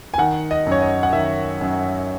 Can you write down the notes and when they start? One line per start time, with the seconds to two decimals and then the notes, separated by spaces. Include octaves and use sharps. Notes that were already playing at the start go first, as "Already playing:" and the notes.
0.14 G#5
0.18 D#3 F#5
0.51 D#5
0.67 F#2 C#5
0.82 D#5
1.03 F#5
1.13 D#3 E5
1.61 F#2